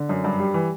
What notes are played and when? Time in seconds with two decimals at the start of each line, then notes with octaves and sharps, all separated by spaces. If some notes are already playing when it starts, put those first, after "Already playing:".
Already playing: D3
0.09 F#2
0.24 G2
0.40 G3
0.54 E3